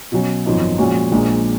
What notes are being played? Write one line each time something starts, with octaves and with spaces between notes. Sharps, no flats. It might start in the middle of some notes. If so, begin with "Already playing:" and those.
B2 F#3 C#4
G#1 F#2 F3 B3 D#4
A#2 F3 G#3 C#4 F#4
A#1 A#2 G#3